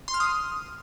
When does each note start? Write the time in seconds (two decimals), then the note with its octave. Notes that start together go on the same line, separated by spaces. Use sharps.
0.08 C6
0.14 F6
0.20 D#6